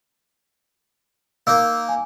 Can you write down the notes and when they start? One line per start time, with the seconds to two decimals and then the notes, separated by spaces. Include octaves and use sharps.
1.47 A#3 D#4 E6
1.89 G#5